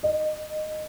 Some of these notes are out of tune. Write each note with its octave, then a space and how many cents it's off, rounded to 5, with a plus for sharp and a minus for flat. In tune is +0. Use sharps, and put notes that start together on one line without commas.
D#5 -20